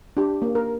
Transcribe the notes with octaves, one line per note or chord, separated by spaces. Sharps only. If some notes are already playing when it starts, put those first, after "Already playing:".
D4 G4
A#3
A#4